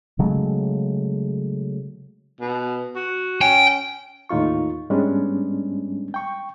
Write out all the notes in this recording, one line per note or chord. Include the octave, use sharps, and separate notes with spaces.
C#3 F#3 G#3 A3
B2
F#4
C#4 G5
D#2 A2 D#4 F4 C#6
G#2 G3 G#3 B3 C#4 D4
G5 C#6